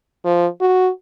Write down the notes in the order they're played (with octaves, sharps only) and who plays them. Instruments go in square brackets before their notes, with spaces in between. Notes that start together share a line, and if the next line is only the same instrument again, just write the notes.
[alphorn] F3
F#4